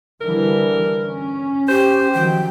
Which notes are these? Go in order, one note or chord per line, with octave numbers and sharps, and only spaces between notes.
D3 E3 G3 A#4
C#4
G4 C5
D#3 F3 F#3 G5